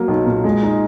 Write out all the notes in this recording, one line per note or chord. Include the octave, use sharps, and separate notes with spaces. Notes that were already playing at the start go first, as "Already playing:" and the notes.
Already playing: F#3 A#3
B1
A#2
G#3
D#4